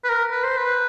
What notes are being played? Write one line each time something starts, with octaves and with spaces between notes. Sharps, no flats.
B4
A#4
B4
C5
B4